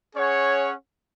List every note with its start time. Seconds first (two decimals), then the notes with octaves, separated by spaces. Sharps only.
0.14 C#4 G#4 C#5 F#5